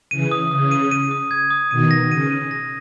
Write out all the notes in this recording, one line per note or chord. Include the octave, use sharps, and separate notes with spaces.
C#3 E3 D#7
D#6
C#3 D#6
D#7
D#7
D#6
G#6
D#6
B2 D#3 D#7
A#6
C#3 D#7
D#7
A#6